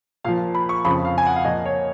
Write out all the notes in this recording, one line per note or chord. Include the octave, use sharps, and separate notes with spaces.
A#2 F3 F5
B5
C#6
F2 C#3 F3 B5
F5
G#5
F#5
F5
A#2 F3 D#5
C#5